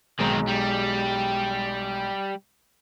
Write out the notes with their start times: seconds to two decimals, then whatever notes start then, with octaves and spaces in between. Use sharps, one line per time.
0.19 B1 D#3 G#3 C4 A#5
0.47 G3